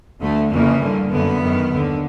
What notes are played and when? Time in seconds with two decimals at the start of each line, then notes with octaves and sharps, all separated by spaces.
0.21 D2 D3 A3
0.51 F2 C#3 E3 A#3
0.82 G2 D3
1.11 F#2 D3 B3
1.42 F#2 D#3
1.72 D#2 D3